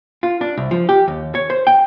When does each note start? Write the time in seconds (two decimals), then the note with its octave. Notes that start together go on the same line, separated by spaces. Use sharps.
0.23 F4
0.41 D4
0.57 C2
0.71 F3
0.89 G4
1.08 D#2
1.35 C#5
1.50 C5
1.67 G5